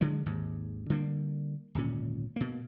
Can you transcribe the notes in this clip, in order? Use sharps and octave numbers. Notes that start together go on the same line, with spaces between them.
D3 F#3 G#3
G#1 D#2 G#2
D3 G3 A3 A#3
D1 G#1 A#2 C#4
B2 A#3